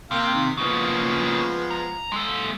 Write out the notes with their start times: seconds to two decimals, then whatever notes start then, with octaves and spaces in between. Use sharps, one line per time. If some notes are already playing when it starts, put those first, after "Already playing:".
0.11 C3 A#3 F5 G5
0.34 D#3
0.57 C#3 F3 G#3 A#3 B3
1.71 A#5
2.12 G#3 A4